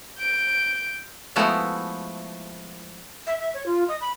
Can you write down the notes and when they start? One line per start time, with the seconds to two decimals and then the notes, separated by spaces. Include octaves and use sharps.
0.18 G6 D7
1.36 F3 G#3 A3 B3 E4 F#4
3.27 E5
3.39 E5
3.54 C#5
3.66 F4
3.88 D#5
4.01 B5